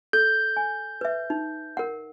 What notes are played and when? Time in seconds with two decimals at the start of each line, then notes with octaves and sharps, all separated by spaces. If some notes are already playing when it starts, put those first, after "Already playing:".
0.13 A4 G6
0.57 G#5
1.01 B4 E5
1.30 D#4
1.77 A#4 F#5